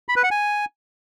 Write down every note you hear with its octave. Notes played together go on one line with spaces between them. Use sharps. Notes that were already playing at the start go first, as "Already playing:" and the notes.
B5
B4
F#5
G#5